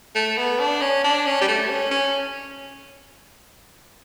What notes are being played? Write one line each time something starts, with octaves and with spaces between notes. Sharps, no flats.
A3
B3
D4
C#4
D4
C#4
G3
A3
C#4
C#4